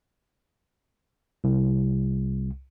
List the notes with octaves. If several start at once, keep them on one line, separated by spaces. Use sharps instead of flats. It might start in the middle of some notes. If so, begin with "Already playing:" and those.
C2